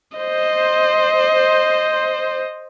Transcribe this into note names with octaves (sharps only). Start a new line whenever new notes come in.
C5 D#5